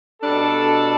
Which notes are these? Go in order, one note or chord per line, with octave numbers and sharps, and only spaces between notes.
B2 G3 D4 A4